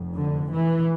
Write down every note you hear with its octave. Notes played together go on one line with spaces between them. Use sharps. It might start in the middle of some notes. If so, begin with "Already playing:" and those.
Already playing: F1 F2
D3
E3